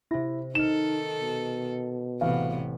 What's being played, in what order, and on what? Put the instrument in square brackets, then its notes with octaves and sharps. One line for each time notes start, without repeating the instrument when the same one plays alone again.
[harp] C3 A#6 [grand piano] E4
[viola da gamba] D#3 A4 [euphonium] D#4 [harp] F6 C#7 [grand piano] E7
[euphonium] B2
[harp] A1 B3 [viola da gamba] C3 [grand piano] F5